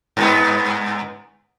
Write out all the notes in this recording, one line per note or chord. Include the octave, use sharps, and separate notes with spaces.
G2 G#3 B3